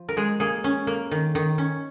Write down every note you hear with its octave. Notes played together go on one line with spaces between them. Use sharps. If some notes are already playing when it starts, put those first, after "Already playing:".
Already playing: F3
A#4
G#3 G#4
A#3 G#4
C#4
A#3
D#3
D#3
C#4